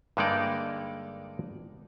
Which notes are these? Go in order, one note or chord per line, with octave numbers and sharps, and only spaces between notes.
G2 D3 G#3 A#3 D#4 D5